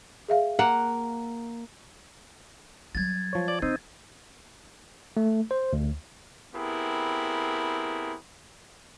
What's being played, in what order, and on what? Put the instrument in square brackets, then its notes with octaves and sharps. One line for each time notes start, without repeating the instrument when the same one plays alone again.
[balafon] G#4 E5 F5
[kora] A#3 F#5
[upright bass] F#3 G3 [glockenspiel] G#6 A6
[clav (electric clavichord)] F3 C#5
[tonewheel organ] D5
[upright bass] D3 [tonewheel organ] C4 D#4
[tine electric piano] A3
C5
D2
[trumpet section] B3 C4 E4 G4 G#4 A#4